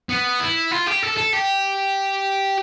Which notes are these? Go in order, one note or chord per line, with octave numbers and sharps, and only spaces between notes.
B3
E4
F4
G4
A4
A4
G4